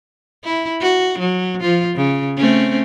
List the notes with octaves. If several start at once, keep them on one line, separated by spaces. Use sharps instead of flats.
E4
F#4
F#3
F3 F4
C#3
A3 C4 C#4